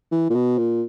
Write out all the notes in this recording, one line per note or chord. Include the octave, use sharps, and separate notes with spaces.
E3
A#2
B2
A#2